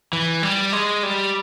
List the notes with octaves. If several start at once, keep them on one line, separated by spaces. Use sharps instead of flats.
E3
G3
G#3
G3